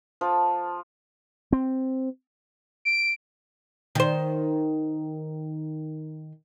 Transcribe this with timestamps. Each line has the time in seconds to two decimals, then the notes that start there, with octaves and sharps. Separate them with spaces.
0.21 F3
1.52 C4
2.85 D7
3.95 D#3 C5